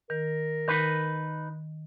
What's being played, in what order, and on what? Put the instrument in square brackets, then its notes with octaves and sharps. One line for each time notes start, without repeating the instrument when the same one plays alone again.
[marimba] D#3 [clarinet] A#4
[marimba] D#3 [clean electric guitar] D#4 B4